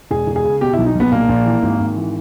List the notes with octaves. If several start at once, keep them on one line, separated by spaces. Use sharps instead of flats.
E1 G#4
E1
G#4
C#3
B2 G4
E4
B1
D#4
B1 B3
A#1 A#3
A#1
E3
G#1
G#1
E3